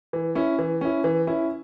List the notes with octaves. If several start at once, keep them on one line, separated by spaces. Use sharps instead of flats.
E3
C#4 E4
E3
C#4 E4
E3
C#4 E4